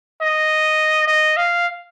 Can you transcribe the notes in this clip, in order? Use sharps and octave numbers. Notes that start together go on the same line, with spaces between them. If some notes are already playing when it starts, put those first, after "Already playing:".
D#5
D#5
F5